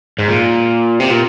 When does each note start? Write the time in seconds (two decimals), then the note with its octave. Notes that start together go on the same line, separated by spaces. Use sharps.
0.19 G#2
0.29 A#2
1.00 C3
1.10 A#2